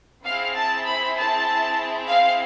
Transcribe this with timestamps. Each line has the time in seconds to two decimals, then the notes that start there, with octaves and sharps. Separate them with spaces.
0.24 C4 E4 G#4 F5
0.55 A5
0.85 B5
1.17 A5
2.08 F5